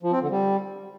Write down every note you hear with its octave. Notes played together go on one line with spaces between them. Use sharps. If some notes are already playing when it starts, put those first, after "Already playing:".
F3
C4
D3
G3